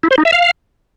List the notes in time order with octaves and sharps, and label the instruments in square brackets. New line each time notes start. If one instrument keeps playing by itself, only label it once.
[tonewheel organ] E4
C5
D#4
E5
F5